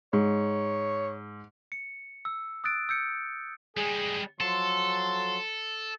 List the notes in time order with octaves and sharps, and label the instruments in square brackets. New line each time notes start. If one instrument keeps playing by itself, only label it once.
[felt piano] G#2 [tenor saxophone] C#5
[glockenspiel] C#7
E6
D#6 E6 F#6 A6 D7
E6 G6 C#7
[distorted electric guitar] G3 G#3 [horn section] G#4
[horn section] F3 F#3 C6 [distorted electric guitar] A4